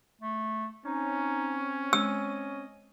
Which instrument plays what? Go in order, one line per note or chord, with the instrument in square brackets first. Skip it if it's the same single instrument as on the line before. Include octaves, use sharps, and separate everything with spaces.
[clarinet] A3
[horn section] C4 C#4 [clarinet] D#4
[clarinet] D#5 [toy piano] E6